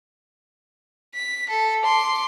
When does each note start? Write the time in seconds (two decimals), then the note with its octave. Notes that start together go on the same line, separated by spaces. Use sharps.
1.15 B6
1.50 A4
1.85 C6 D6